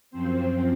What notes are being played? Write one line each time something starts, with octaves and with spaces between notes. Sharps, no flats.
F#2 F3 C4 C5